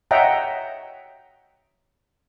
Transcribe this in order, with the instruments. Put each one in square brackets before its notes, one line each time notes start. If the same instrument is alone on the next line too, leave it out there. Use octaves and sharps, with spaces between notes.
[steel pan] C#5 D#5 E5 F#5 G5 A#5